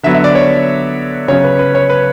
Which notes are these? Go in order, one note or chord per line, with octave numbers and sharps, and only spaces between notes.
D3 F#3 B3 E5
E5
D5
C#5
C#3 F#3 C#4 C#5
B4
B4
C#5
B4